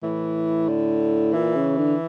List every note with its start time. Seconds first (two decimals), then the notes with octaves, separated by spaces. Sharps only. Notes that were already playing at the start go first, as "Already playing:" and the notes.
0.03 A2 E3
0.69 D3
1.33 A#2 E3
1.56 C#3
1.77 D3